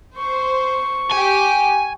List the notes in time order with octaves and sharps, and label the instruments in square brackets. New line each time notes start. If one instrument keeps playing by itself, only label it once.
[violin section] C5 [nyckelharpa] C#6
[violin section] G4 [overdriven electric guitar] G#5